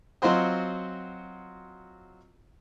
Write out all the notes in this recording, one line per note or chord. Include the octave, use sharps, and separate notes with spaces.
F#3 C4 F4 F#4 C5 D#5